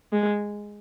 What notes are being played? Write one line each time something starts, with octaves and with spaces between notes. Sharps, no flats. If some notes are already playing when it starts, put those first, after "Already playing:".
G#3